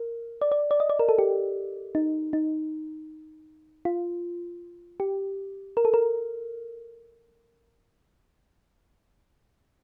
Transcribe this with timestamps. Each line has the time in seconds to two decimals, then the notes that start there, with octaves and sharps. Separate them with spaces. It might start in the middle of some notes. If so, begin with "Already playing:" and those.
Already playing: A#4
0.42 D5
0.52 D5
0.71 D5
0.80 D#5
0.90 D5
0.99 A#4
1.09 A4
1.19 G4
1.95 D#4
2.33 D#4
3.85 F4
5.00 G4
5.77 A#4
5.85 A4
5.94 A#4